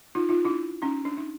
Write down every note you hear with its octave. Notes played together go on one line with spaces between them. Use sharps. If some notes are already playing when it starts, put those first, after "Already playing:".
D#4 F4
D#4 F4
D4 E4
C#4 D#4
D4
D#4